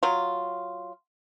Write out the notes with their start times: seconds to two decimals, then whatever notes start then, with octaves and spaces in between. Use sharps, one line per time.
0.03 F#3 F4